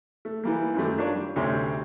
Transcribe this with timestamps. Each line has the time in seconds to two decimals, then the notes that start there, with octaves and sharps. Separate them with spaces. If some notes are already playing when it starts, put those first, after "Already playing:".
0.25 A3
0.44 E3 G3 A#3
0.75 F#2 D#3 F#3 G3 A3
0.98 D4 F4 A#4 C#5 D5
1.15 G3
1.36 D2 C3 A3 C#4 C6